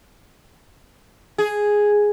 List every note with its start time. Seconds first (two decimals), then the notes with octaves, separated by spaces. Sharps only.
1.38 G#4